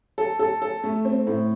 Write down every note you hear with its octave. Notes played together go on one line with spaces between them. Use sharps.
A4
A4
A4
A3
C4
A2